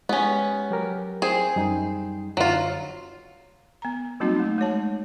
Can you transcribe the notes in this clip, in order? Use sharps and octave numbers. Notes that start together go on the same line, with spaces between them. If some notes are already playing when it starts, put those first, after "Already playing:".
G#3 B3 C#4 G4
F#3 G4 A#4
C4 G#4
F#2 G3 D#4
F#2 D3 F#3 F4
B3 A#5
F#3 G3 A#3 C4 D#4 F#4
A3 D#4
G#3 F#4 C#5 A5